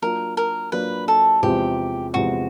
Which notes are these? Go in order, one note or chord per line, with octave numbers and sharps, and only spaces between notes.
F#3 A#3 D4 F4 A#4
A#4
F#3 A#3 D4 F4 B4
A4
E2 C3 F3 G#3 C4 G4
E2 C3 F3 G#3 C4 F#4